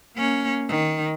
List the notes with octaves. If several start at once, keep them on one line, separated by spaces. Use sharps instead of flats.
A#3 C#4
D#3